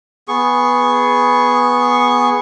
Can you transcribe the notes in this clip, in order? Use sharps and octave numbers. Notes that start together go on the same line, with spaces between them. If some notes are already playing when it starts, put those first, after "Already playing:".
B3 G#4 C#6